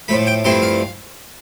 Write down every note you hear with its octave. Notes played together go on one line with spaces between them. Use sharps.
A2 F3 A3 B5
G5
G2 F3 A3 C4 E4 C6
F5